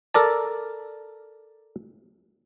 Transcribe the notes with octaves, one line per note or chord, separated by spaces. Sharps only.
A4 A#4 D5 A5